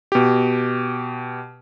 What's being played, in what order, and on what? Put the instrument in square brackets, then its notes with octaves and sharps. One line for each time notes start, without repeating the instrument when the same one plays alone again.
[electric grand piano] B2 G4